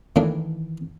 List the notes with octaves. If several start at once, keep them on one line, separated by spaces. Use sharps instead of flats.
A2 D#3 E3 A#3 D4